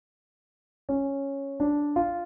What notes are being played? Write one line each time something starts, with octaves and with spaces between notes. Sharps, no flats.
C#4
D4
F4